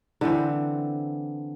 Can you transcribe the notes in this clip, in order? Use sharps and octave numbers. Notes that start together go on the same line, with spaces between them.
D3 E3 C4